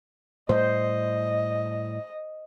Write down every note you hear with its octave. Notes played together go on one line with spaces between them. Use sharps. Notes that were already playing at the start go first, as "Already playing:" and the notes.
A2 G3 C5 D#5